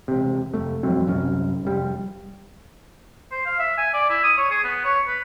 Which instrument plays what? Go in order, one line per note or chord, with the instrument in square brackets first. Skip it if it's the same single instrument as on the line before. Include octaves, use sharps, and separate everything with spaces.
[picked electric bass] E1 C3
F1 A3
E1 F2 F#3 C4
C2 F#2 C#4
F1 G3
[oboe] C5
F5
E5
G#5
D5
E4
D#6
C#5
G#4
B3
C#5
B4